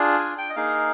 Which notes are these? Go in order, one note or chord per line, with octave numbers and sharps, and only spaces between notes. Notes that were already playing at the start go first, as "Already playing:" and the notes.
Already playing: D4 F4 G#4
G#5
G5
D#5
A#3 D#4 G#4 F5